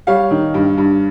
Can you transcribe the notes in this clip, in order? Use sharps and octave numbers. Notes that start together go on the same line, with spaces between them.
G3 C#5 F5
D#3
G2
G2